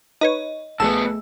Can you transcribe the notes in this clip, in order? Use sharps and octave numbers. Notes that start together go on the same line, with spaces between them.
D#4 B4 C#5 D#5
A#1 A2 A3 B3 G#4 A5 E6